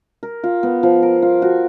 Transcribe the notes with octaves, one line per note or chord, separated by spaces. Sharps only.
A#4
F4
B3
F3
A#4
F4
F#4